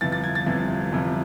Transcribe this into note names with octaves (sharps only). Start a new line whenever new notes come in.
G1 F2 C3 E3 A6
A6
G#6
A6
G1 F2 C3 E3
G1 F2 C3 E3